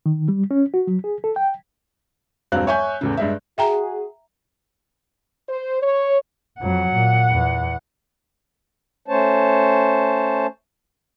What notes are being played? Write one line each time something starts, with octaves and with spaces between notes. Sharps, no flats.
D#3
G3
C#4
F#4
F#3
G#4
A4
G5
E1 G2 F#3 C4 F5 F#6
C#5 E5 G#5 C#6 G6
E2 A2 C#3
G2 G#3 E5
F#4 G#4 E5 G5 A#5
C5
C#5
F2 F#3 F#5
A#2
E2
A3 C#4 C5 C#5 A5